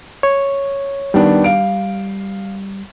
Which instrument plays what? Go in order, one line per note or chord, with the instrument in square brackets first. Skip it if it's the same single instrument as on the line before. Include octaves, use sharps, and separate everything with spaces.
[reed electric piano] C#5
[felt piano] D#3 B3 D4 [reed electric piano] G3
[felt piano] F5 D7